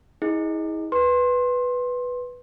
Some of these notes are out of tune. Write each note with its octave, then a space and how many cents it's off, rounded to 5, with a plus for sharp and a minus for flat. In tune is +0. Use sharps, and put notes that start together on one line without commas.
E4 -40 G#4 +0 D#5 +0
B4 +0 C6 +20